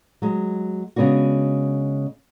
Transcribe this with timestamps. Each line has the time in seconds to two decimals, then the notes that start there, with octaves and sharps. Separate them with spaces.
0.22 F#3 G#3
0.96 C#3 G#3 B3 D4 F#4